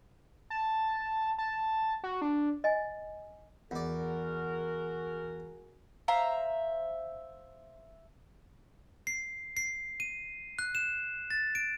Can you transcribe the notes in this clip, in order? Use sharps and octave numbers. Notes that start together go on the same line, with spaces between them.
A5
A5
F#4
D4
D#5 G#5
E2 F#4 G#4 A#4 D5
C5 E5 F5 A#5
C7
C7
D#7
F#6
E7
A6
D7